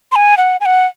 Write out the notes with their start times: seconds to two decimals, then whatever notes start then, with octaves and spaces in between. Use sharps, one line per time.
0.12 C6
0.16 G#5
0.37 F#5
0.61 G#5
0.66 F#5